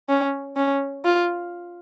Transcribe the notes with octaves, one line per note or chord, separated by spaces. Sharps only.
C#4
C#4
F4